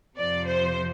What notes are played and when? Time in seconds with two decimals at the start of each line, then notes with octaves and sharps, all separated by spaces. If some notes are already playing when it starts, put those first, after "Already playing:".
0.17 F2 C3 F3 D5
0.46 C5